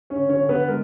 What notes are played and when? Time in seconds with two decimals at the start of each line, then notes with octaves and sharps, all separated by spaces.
0.10 C#4 C#5
0.17 D3
0.29 C#4 C#5
0.43 D3
0.49 B3 B4
0.68 G#3 A#4